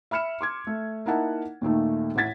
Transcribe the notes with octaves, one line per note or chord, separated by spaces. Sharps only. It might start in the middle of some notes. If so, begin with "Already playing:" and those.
E5 B5 F6 C#7 E7
C6 D6 G#6
A3
A#3 D#4 E4 F#5 A5
D#2 A#2 D#3 A3
A1 A2 F#5 G#6 A6 B6